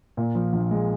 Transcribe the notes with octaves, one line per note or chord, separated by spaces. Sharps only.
A#2
F3
A#1
G#3